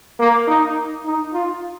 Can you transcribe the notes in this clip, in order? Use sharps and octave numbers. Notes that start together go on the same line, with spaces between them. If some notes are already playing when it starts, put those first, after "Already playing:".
A#3
D#4
D#4
F4